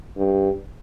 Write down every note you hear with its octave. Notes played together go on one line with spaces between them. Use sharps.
G2